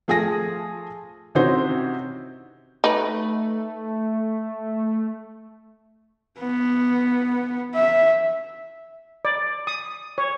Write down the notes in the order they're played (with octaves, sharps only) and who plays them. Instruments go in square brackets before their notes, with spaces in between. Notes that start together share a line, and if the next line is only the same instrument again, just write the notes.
[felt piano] F3 A3 G#4 G#5 D#6 A#6
C3 E3 C#4 D#4 F#4 C5
[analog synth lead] A3 [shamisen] D#4 B4
[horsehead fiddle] B3
E5
[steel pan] D5
D#6
C#5